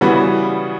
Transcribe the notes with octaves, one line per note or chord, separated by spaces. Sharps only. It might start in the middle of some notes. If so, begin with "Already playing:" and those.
C#3 E3 G3 B3 F#4